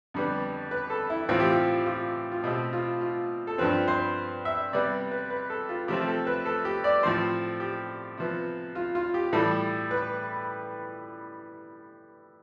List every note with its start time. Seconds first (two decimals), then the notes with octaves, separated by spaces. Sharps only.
0.14 F2 D3 G3 B3
0.71 B4
0.90 A4
1.10 E4
1.29 A2 E3 A3 C4 F4
1.40 G4
1.51 F4
1.86 F4
2.32 F4
2.43 B2 A3 C4 G4
2.73 F4
3.01 F4
3.47 A4
3.58 G2 F3 C4 B4
3.88 C5
4.45 E5
4.73 C3 G3 B3 D5
5.11 B4
5.30 B4
5.50 A4
5.69 F4
5.88 C3 F3 A3 C4 G4
6.08 A4
6.27 B4
6.45 A4
6.65 G4
6.84 D5
7.03 A2 F3 C4 C5
7.60 G4
8.17 C3 F3 B3
8.75 F4
8.95 F4
9.14 G4
9.33 A2 E3 G3 A4
9.91 B4